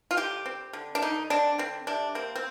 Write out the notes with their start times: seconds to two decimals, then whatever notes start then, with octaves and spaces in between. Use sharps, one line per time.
0.11 F4
0.17 D3 G4
0.46 C4
0.73 D3
0.95 D4
1.02 D3 D#4
1.30 C4 D4
1.58 D3 C4
1.87 C3 D4
2.15 A#3 C4
2.36 C4